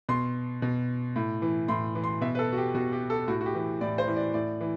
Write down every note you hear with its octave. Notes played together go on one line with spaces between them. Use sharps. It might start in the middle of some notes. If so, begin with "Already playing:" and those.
B2 C6
B2
A2
E3
A2 C6
E3
C6
B2 E5
B4
A4
F#4
G4
B2 F#4
G4
A4
A2 F#4
F#4
G4
E3
A2 D5
C5
E3
D5
A2 D5
E3